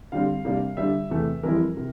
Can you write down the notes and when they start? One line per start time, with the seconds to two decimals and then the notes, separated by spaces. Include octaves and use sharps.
0.12 D3 G3 C4 F5
0.45 C3 G3 A#3 D4
0.77 D3 G3 D4 E5
1.10 E2 C3 E3 A3
1.43 F2 E3 G3 C4 E4 A#4
1.77 C3